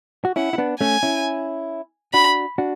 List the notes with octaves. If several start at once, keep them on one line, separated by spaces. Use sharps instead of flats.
F#4
C#4 E4 F#5
E4
B3 D4
A3 C#4 G#5
C#4 E4
D4 F#4 B5
D4 F#4